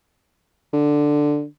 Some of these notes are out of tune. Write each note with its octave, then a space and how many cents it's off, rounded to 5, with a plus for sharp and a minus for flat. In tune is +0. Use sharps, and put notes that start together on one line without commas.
D3 +5